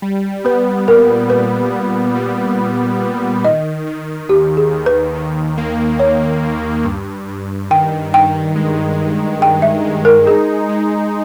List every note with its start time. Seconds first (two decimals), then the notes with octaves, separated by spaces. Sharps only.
0.02 G3
0.45 B3 B4
0.88 A#2 A#4
1.30 G3 B4
1.73 A#2
2.15 G3
2.58 A#2
3.01 A#2
3.45 D#3 D#5
3.87 D#3
4.29 D#2 G4
4.57 G#4
4.72 D#2
4.86 B4
5.15 D#3
5.58 A#3
5.99 D#2 C#5
6.43 D#2
6.85 G2
7.28 G2
7.71 D#3 G5
8.13 D#3 G5
8.56 G#3
8.99 G2
9.42 G2 G5
9.62 E5
9.85 G#3
10.05 A#4
10.27 D#4 G#4
10.69 G#3